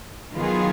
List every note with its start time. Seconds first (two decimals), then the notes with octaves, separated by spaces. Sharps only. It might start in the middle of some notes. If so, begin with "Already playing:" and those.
0.34 D#3 F#3 B3 F4 G#4